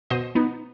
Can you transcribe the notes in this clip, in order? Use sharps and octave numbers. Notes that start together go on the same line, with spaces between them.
B2 C5 D#5
B3 D#4